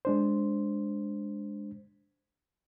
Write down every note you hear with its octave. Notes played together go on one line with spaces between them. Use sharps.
G#3 D4 C5